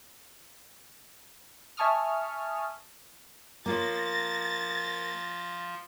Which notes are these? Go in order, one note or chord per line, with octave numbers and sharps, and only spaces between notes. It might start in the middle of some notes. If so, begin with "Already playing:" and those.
E5 G#5 A5 C#6 D#6 F6
F3 A#3 F4 C#5 A6 A#6